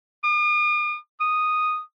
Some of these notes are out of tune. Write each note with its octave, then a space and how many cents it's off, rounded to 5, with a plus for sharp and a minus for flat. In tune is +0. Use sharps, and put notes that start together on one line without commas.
D#6 -45
D#6 -5